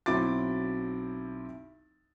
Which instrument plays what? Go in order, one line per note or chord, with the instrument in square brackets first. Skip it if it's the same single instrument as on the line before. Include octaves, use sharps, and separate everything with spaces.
[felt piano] B1 F#3 C4 E4 D6 A6